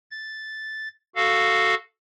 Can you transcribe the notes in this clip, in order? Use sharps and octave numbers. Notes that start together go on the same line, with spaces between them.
A6
F#4 A4 F5